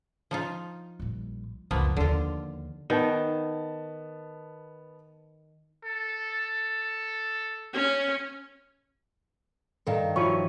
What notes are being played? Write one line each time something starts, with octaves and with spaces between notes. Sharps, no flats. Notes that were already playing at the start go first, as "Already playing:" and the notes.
F3 D#4 F4
A#1 G3
C#2 F#2 F3 A#3 B3
D#2 D3 F4
D#3 B3 A5
A4
C#4
G2 D#3 A4 F5 A#5
F3 E4 F#4 C#5 C#7 D#7